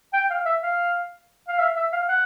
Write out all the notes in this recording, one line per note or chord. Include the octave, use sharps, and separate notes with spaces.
G5
F5
E5
F5
F5
E5
E5
F5
F#5